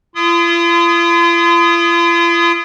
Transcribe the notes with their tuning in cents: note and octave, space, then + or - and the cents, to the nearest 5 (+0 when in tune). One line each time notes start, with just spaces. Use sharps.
F4 -45 C6 -40 D#6 +0